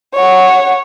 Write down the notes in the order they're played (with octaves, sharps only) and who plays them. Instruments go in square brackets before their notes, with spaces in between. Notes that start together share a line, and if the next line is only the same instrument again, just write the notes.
[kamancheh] C#5 F#5